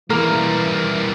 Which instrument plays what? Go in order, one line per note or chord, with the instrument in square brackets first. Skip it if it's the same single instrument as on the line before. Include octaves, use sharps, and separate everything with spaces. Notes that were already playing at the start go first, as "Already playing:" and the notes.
[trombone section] E3 [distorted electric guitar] G3 A#3 [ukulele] A#4